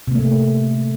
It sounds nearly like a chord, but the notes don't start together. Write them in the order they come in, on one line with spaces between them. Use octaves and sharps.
C3 A#3 A3